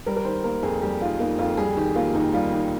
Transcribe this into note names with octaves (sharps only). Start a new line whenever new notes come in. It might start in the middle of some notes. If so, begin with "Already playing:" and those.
G3 A#4
A#4
D#3 C5
A#3 A#4
F2 G#4
G3 G4
D#3 F4
A#3 D#4
F2 F4
G3 G#4
D#3 G4
A#3 F4
D#2 D#4
G3 F4
D#3